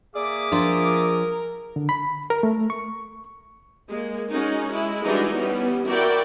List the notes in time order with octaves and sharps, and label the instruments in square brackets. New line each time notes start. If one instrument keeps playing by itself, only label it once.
[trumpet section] A#3 E5 D6 [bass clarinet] G#4 [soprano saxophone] D5
[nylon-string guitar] F3 D4 F4 [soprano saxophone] A#4
[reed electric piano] D3
B5
A#4
A3
C#6
[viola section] G#3 A#3
G#3 C#4 D#4 F#4
G#3 E4
E3 G3 G#3 D4 D#4 F#4
E3 G3 B3 C#4
E4 F#4 A#4 D5 G5